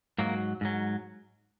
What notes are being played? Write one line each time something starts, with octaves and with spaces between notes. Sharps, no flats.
G#2 F#3 A#3
G#2 F#3